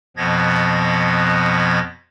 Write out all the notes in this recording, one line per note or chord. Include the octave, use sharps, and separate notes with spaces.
F2 B2 F3 B3 G#6 A#6